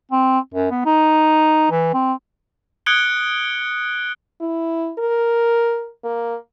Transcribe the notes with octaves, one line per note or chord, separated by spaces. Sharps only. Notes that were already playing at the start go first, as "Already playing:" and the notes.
C4
F#2
B3
D#4
E3
C4
D#6 F#6 G#6 C#7 D7 G7
E4
A#4
A#3